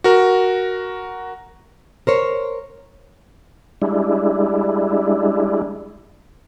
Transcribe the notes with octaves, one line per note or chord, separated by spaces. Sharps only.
F#4 A#4
A#4 C5 C#5
G3 G#3 D4 E4